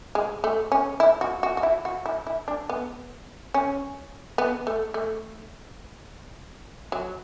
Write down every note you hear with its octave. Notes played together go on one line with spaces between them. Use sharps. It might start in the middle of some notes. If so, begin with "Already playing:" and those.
G#3
A3
C#4
E4
F#4
F#4
F#4
E4
F#4
E4
E4
D4
B3
C#4
B3
A3
A3
F#3